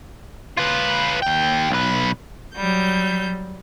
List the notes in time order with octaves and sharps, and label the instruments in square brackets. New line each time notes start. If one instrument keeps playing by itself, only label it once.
[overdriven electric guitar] F4 B4
D#2 G5
B1 B4
[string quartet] F#3 G3 G6